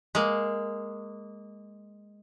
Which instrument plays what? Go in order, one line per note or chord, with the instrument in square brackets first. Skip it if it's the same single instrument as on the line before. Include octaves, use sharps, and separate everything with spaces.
[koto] G#3 A#3